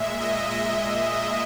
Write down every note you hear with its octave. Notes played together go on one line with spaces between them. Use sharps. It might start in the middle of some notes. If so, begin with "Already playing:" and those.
Already playing: A#2 G#3 E5
D#5
D#5